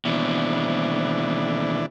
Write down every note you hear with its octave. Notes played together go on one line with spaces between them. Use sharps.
D#2 B2 E3 D4